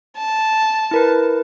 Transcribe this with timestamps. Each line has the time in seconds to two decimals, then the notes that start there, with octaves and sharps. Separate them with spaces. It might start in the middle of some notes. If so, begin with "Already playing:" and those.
0.18 A5
0.91 E4 A#4 B4